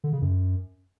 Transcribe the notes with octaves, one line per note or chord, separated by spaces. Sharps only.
D3
C#3
F#2